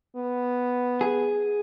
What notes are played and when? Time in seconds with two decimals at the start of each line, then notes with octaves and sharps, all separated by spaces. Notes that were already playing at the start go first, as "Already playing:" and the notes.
0.16 B3
1.01 G#4